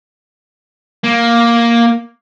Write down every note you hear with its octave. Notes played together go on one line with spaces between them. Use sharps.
A#3